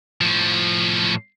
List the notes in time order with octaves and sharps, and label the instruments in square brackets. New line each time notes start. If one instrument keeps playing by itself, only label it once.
[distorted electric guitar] A2 F3